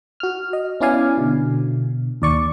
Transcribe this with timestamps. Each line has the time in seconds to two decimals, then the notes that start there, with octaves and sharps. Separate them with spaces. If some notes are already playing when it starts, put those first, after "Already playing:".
0.20 F#4 F6
0.53 D#5
0.81 B3 C#4 E4 D5 F5 G#5
1.18 B2 D3
2.22 D#2 D5 C#6